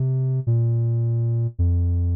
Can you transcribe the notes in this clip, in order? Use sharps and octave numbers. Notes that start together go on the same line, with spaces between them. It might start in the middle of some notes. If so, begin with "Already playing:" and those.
Already playing: C3
A#2
F2